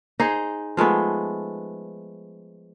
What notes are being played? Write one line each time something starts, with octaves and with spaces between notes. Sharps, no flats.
D#4 G#4 C5 D#5
F3 G#3 A3 B3